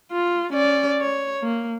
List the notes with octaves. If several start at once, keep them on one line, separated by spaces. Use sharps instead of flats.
F4
C#4 D5
C#5
A#3